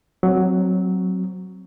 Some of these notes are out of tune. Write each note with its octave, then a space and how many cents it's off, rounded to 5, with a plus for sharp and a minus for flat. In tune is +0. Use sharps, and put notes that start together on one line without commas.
F#3 +5 C4 +0